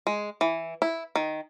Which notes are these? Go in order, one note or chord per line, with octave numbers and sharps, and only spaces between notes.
G#3
E3
E4
D#3